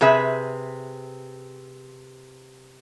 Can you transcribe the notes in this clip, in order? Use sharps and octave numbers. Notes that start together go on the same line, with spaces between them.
C3 G#4 B4 E5